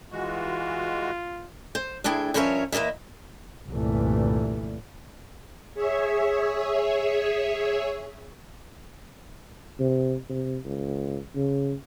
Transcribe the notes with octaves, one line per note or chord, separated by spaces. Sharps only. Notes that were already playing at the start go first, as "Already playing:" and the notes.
E3 G#3 F4 F#4
C5
D2 D4 E4 G#4 G5
G2 F3 C#4 A#4 C#5 E5
E2 A#3 A#4 D#5 E5
G1 C2 G2 A#2 E3 A3
G#4 C#5 E5
C3
C3
C#2
C#3